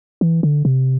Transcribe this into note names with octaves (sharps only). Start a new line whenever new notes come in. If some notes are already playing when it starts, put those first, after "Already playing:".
E3
D3
C3